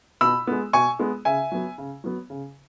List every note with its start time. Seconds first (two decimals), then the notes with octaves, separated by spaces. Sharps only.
0.21 B2 B5 E6
0.47 G#3 B3
0.73 B2 G#5 C#6
0.99 G#3 B3
1.25 C#3 E5 G#5
1.52 F#3 B3
1.78 C#3
2.04 F#3 B3
2.30 C#3